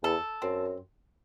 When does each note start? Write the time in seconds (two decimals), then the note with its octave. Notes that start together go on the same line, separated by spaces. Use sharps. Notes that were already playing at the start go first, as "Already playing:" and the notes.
0.03 E2 A4
0.42 F#2 C4